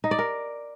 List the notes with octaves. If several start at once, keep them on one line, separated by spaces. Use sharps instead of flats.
D#4
D5
A#4